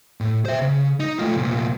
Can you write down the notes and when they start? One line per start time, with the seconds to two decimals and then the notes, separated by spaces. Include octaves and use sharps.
0.20 A2
0.45 C5 E5
0.62 C#3
1.00 D#4
1.19 A3 F4
1.35 C2 A#2